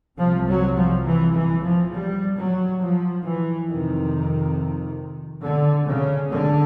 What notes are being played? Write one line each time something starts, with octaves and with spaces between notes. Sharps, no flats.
C2 C3 F3
F#3
F3
E3
E3
F3
G3
F#3
F3
E3
F2 C3 D#3
D3
C#3
D3